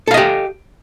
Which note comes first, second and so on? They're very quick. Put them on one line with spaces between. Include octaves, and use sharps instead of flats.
A4 F5 D#5 G4